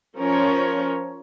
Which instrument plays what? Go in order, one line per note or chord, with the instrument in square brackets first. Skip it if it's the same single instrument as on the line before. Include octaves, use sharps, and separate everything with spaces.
[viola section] F3 C#4 A#4 C#5